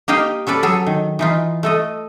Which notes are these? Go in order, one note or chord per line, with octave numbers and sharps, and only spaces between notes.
A#3 D#4 G4 D#5 F5 G5
C#4 A4 B4 D5
F#3 G#4 A4
D#3
E3 D#4 F4
A3 A4 D#5